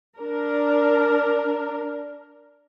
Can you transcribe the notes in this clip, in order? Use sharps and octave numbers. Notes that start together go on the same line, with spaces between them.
D4 A#4